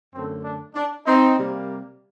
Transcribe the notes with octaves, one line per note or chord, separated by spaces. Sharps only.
F#2 D3 A3 C4
D4
D4
C4 D#4
C3 G3 A#3